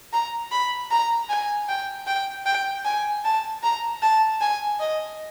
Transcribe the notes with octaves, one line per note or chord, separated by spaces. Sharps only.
A#5
B5
A#5
G#5
G5
G5
G5
G#5
A5
A#5
A5
G#5
D#5